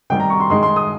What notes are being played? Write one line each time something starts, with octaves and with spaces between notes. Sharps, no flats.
C3 D#3 G3 G5
A#5
C#6
C6
D#3 G#3 D#4 C6
C6
D#6